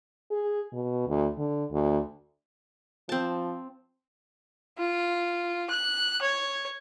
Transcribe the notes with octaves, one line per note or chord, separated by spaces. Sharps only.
G#4
B2
D2
D3
D2
F3 C4 A5
F4
F#6
C#5